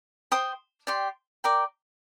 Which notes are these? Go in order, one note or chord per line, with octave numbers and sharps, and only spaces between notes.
C5 G5 C6 D#6
G4 D5 G5 C6
A#4 D5 G5 D6